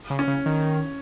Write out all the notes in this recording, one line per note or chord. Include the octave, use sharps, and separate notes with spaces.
C#3
C#4
C#3
D#3